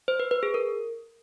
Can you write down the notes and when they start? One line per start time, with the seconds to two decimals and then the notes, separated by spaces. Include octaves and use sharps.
0.08 C5
0.20 B4
0.31 B4
0.43 G#4
0.54 A#4